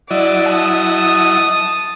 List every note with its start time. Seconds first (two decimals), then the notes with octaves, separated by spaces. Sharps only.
0.11 F#3 E4 D5 D#5
0.51 A5 D#6